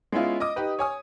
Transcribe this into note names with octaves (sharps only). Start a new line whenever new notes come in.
G#3 B3 C#4 E4 F4
D#5 D6 D#6
D#4 G4 B4
C#5 G#5 D#6